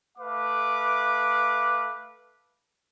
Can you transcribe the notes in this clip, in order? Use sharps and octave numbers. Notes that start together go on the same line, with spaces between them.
A3 B4 F5 D6